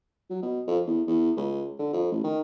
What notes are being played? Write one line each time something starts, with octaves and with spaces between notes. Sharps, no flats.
F#3
B2
F2
E2
E2
C#2
D3
F2
A1
D#3